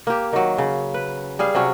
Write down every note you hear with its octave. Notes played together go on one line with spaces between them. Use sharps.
A#3 G4
D#3 F#3
C#3
B4
G3 G#4 F5
C3 F#3 C#4